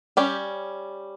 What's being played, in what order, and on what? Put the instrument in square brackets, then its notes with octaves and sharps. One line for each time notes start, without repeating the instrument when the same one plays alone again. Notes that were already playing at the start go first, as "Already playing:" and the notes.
[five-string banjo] G3 C#4 G4